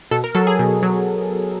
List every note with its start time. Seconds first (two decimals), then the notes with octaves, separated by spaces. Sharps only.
0.11 B2 A4
0.24 A#4
0.35 F#3 A4
0.47 G#4
0.59 B2
0.83 F#3